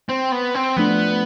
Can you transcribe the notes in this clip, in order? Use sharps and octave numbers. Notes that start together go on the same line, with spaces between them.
C4
B3
C4
F3 A3 B3 D4